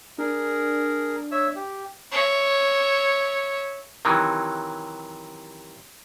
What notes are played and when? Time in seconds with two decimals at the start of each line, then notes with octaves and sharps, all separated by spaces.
0.18 D4 G#4 A#4
1.32 C#5 E5 E6
1.56 G4
2.12 C#5 E5
4.05 C3 D#3 E3 F#3